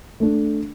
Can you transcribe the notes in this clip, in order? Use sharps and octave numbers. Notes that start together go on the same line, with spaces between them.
A3 D4